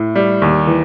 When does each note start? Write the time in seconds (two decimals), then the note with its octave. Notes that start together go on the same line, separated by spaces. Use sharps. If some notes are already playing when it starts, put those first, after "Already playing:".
Already playing: A2
0.15 G3
0.42 D#2
0.67 E3